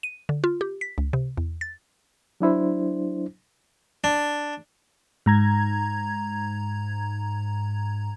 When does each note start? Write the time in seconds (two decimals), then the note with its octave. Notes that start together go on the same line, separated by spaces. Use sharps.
0.03 D#7
0.29 D3
0.44 F4
0.61 G4
0.81 B6
0.98 C#2
1.13 C3
1.37 E2
1.61 A6
2.40 F#3 D4 E4 C5
4.04 D4
5.26 G#2 A#5 G#6